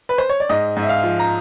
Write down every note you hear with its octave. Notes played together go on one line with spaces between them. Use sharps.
B4
C5
C#5
D5
G#2 D#5
G#2
E5
F5
F3
A#5